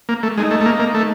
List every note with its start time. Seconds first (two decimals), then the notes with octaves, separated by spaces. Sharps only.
0.09 A#3
0.23 A3
0.37 G#3 D#4
0.51 A3
0.61 A3
0.66 A#3
0.79 A#3
0.94 A3